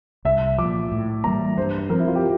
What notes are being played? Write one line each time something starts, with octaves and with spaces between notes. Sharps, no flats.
C2 E5
A#2 F3 D6
A2
E3 G3 A#3 A#5
G2 C5
F3 C4 A#4
E4
F4
G4